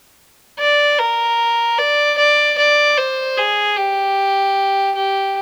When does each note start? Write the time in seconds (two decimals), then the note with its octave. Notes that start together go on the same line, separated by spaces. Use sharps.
0.59 D5
0.99 A#4
1.79 D5
2.18 D5
2.58 D5
2.98 C5
3.37 G#4
3.76 G4
4.96 G4